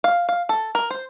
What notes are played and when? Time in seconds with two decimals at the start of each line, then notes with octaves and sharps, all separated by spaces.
0.04 F5
0.29 F5
0.49 A4
0.75 A#4
0.90 C5